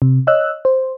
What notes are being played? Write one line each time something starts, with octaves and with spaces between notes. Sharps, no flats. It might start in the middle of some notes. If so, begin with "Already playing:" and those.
C3
C#5 D#5 E6 F#6
C5